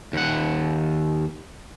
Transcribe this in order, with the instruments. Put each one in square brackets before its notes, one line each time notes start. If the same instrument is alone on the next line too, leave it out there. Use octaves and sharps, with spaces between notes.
[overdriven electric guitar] D#2 F#5